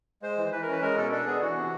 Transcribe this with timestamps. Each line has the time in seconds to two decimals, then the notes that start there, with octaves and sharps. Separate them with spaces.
0.22 G#3 C5
0.37 E3
0.52 E3 B4
0.62 A#4
0.67 C#4 B4
0.82 G#3 A#4
0.97 B2 A4
1.12 D4 A4
1.26 B3 G#4
1.41 E3 F#4
1.56 C3